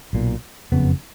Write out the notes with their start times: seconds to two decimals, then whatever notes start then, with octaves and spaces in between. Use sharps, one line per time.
0.13 B1 A#2
0.72 F#1 F2 C#3 B3